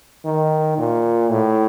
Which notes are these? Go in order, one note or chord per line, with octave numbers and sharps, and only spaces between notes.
D#3
A#2
A2